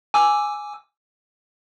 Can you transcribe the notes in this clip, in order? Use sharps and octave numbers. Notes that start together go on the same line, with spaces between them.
G#5 D6 E6